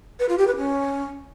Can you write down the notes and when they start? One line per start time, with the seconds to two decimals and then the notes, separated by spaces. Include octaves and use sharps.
0.20 B4
0.29 F4
0.38 G4
0.47 B4
0.57 C#4